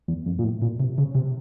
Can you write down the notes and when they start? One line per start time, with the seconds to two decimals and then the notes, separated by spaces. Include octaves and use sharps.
0.08 E2
0.26 F2
0.39 A#2
0.44 A2
0.62 A#2
0.80 C3
0.98 C#3
1.15 C3